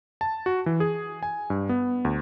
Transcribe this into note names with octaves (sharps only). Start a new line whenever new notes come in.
A5
F#4
E3
G#4
G#5
G2
B3
D2